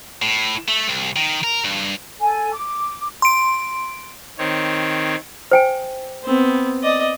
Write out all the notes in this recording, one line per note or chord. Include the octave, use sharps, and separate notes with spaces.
A2
A3
C2
D#3
A#4
G2
A4 G#5
D6
C6 D7
D#3 C4 C#5
C5 G5 G#5
B3 C4
D5 D#5